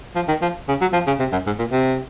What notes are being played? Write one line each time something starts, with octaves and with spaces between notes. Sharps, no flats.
F3
D#3
F3
C#3
F#3
F3
C#3
C3
F#2
G#2
A#2
C3